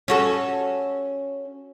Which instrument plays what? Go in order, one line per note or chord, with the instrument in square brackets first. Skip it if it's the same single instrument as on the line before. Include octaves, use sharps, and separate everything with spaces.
[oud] C#4 F#4 A4